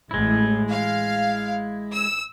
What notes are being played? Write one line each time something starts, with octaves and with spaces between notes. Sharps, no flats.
A1 A2 G#3 E4
F5
E6